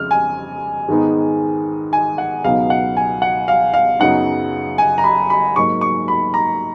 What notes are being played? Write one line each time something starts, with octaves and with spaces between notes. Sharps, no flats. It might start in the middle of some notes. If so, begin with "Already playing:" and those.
Already playing: F2 C#3 G#3 F6
G#5
G#2 D#3 G#3 B3 D#4
G#5
F#5
C#2 B2 F#3 B3 D#4 F5
F#5
G#5
F#5
F5
F5
F#2 C#3 F#3 B3 D#4 F#5
G#5
A#5
B5
B5
G#2 F#3 A#3 C#6
C#6
B5
A#5